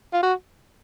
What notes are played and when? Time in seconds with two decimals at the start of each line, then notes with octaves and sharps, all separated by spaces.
0.13 F4
0.23 F#4